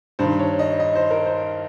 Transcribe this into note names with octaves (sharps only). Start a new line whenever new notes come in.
G2 D#3 C5
C#5
D#5
D#5
C5
A#4
C5